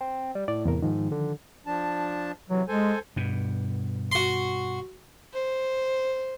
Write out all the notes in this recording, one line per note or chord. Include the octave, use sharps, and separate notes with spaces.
C4
G3
A2 D5
E2 C3 A#4
G#2 D#3 F3
D3
F3 D4 A5
C3 E3 F#3
G#3 A4 C5 G#5
G2 B2
F#4 C6
C5